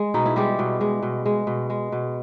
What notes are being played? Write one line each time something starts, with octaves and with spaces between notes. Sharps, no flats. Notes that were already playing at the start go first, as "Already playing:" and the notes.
Already playing: G#3
B2 D#4
E4
G3 G#3 G4
B2
G#3
B2
G#3
B2
G#3
B2